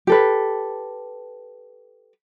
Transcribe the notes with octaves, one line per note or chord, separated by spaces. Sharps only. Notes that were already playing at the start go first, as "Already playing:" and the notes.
G4 A4 B4